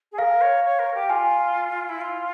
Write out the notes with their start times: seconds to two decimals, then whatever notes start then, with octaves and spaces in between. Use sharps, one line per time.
0.12 G#4
0.18 A#4 F5
0.41 C#5
0.64 C#5
0.79 A#4
0.94 G4
1.09 F4 G#5
1.89 E4
2.00 F4